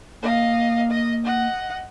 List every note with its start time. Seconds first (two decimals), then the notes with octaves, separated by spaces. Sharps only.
0.22 A#3 D#5 F5
0.91 D#5
1.25 D#5 F#5